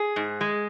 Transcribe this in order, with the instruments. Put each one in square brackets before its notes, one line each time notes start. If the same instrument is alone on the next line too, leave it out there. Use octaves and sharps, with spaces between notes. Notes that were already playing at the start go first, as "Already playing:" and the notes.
Already playing: [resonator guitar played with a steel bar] G#4
G#2
G#3